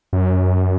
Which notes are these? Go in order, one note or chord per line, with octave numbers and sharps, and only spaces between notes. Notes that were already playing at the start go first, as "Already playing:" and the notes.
F#2